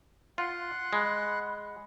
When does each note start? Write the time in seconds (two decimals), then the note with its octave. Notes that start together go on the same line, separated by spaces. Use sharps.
0.38 F4 F#5 C6 F#6
0.93 G#3 B5